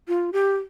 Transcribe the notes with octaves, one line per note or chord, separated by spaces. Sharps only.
F4
G4